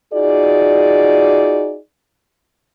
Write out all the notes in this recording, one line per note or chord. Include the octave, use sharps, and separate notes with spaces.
D#4 F4 F#4 G#4 D5